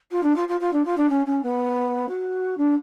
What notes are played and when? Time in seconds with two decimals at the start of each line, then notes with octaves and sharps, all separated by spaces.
0.11 F4
0.23 D4
0.36 F4
0.48 F4
0.60 F4
0.73 D4
0.85 F4
0.97 D4
1.09 C#4
1.26 C#4
1.43 B3
2.09 F#4
2.57 D4